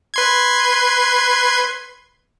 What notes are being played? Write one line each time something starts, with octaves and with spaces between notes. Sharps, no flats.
B4 C6 G#6